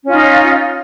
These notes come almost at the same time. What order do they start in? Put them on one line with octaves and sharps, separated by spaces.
C#4 F4 D#4